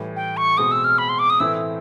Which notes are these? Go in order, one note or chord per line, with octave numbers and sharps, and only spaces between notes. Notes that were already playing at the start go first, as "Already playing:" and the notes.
Already playing: A2 E3 G3
G5
C#6
B2 G#3 C4 D#6
E6
F6
B5
C6
D6
D#6
A2 E3 A3 C4 E4 E6